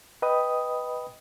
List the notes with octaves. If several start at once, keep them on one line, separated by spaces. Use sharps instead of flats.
B4 D#5 G5 B5 D#6